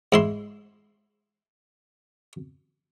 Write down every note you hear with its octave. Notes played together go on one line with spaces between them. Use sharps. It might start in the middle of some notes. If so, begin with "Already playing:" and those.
G#2 E4 C6